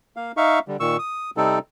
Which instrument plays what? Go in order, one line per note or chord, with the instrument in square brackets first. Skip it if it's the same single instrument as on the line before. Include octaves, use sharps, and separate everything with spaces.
[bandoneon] A#3 F5
D#4 E5 F5 C#6
D3 G3
A#2 D#3 C#6 E6
D#6
C3 G3 C4 D#4 A4